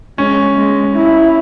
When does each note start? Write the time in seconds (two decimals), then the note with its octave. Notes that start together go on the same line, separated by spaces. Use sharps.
0.18 G#3 C#4
0.56 G#3
0.96 E4